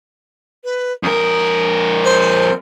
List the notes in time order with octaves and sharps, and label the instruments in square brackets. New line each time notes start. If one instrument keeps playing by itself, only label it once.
[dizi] B4
[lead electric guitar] F2 A#4 [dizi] D#6
[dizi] C5